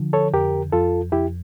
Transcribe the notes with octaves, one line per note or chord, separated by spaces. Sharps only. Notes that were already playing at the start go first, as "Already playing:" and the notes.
Already playing: D3 F3
A4 C#5
F2 G4 A#4
F2 F4 A4
F2 E4 G4